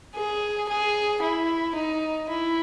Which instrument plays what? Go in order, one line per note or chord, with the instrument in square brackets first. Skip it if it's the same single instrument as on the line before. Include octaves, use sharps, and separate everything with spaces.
[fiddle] G#4
G#4
E4
D#4
E4